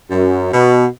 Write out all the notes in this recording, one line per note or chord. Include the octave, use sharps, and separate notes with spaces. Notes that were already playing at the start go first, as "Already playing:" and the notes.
F#2
B2